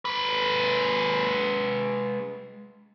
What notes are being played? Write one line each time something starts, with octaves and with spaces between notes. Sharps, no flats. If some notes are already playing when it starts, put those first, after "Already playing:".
G#3 B4